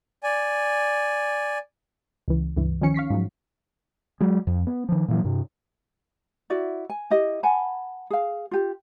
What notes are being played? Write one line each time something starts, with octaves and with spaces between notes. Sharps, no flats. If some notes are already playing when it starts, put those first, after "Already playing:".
D5 G#5
C#2 E3
C#2 G2 E3
D#3 F3 C#4 C#7
F5 C#6 B6 C7
G#2 F3 F#3
F#3 G#3
F2
B3
D#3 F3
A#2 E3 F#3
G2 C3
E4 F#4 D5 E5
G#5
E4 G4 D#5
F#5 G#5 A5 B5
G#4 F5
F4 G4